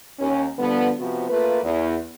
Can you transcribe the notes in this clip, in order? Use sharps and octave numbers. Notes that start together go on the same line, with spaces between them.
D#2 C#4
D3 F3 G3 B3
C3 F3 B3 F#4
A3 A#3 F4 B4
E2